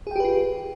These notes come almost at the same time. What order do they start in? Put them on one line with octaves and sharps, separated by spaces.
G#4 G5 G4 B4 F4